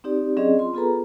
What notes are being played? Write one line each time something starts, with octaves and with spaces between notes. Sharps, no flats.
C4 D#4 G4 D5
F#3 C4 C#4 G#4 D5 D#5
F4 C6
B3 F4 G#4 A4 B4 A#5